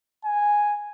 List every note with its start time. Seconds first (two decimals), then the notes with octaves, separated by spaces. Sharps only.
0.25 G#5